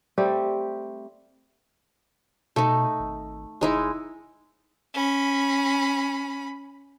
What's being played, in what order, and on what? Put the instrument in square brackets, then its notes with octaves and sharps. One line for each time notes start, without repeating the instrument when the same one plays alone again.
[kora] G3 A3 C4 G4
[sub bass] B2 [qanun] A3 D#4
[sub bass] G#1
[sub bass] F1 [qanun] G#3 D#4 E4
[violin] C#4 B5